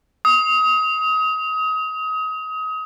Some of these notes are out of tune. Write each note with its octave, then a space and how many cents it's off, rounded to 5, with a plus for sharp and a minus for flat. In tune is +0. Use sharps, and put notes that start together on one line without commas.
D#6 +30